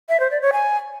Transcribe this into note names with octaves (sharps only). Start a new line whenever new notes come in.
E5
C5
D5
C#5
G#5